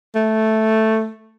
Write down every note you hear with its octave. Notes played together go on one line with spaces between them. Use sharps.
A3